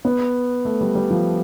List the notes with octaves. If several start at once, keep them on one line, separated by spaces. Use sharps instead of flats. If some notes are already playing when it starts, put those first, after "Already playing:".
B3
A3
G3
G3
F3